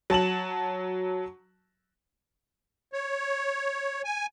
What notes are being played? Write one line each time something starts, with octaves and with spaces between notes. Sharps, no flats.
F#3 A5 E7 F#7
C#5
G#5